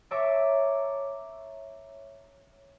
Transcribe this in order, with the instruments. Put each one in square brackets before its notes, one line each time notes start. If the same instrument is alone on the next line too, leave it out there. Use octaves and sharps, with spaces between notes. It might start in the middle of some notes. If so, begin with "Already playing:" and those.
[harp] C#5 E5 A5 A#5 D6